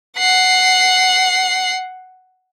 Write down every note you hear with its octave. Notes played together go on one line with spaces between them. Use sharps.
F#5 C7